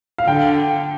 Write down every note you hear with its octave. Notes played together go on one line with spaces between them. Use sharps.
F5
D3 G5